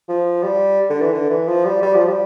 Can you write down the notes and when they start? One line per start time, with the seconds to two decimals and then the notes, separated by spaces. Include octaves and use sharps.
0.09 F3
0.43 G3
0.90 D3
1.02 E3
1.13 D3
1.30 E3
1.48 F3
1.65 G3
1.82 G3
1.95 F3
2.08 G3